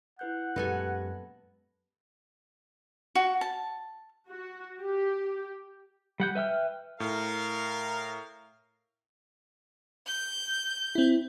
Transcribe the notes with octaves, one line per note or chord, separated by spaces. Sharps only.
E4 B4 F#5 G6
F#2 A#2 G#3 B3 G4 A4 G#5 A#6
F#4
A5
F#4
G4
G3 F#5 G6
B4 E5 G5 F6
A2 A#4 F5
G6
C4 E4